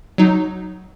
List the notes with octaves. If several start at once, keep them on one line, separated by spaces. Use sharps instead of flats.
F#3 D#4